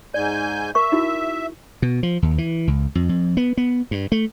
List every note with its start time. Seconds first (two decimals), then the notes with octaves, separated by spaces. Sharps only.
0.14 G#2 D5 G#5 G6
0.75 A#4 E5 C#6
0.92 D#4 E4 F#4
1.82 B2
2.03 F3
2.22 D#2
2.38 E3
2.67 C#2
2.95 F2
3.09 F2
3.37 B3
3.57 B3
3.91 G2
4.12 A3